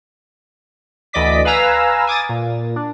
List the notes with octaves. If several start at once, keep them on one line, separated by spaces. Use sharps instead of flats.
D2 E3 D5 D#5 D6 B6
B4 F5 G#5 A#5 E6
G#5 D6 D#6 A6
A#2
D4